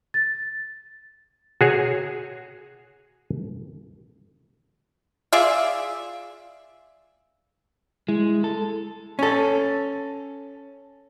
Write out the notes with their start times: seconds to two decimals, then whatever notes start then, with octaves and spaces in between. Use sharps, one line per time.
0.14 A6
1.61 F#4 G#4 C#5
5.33 F4 G#4 D5 E5
8.08 G#3 E4
8.44 A4
9.19 C#4 A4